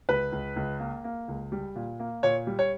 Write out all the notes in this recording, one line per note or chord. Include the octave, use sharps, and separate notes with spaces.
C#2 B4
C#2
C#2
A#3
A#3
C#2
G3
A#2
A#3
A#2 C#5
G3
C#5